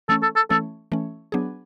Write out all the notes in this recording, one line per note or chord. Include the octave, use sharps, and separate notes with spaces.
E3 A3 C#4 A4
A4
A4
E3 A3 C#4 A4
E3 A3 C#4
F#3 B3 D4 G#4